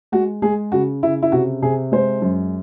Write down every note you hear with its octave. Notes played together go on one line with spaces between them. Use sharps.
G#3 F#4
G#3 G#4
C#3 F#4
C#3 E4
E4
C3 F#4
C3 G#4
G#3 C5
F#2